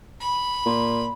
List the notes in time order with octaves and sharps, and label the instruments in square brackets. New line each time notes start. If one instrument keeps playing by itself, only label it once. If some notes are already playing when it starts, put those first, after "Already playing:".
[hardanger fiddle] B5
[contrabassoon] A#2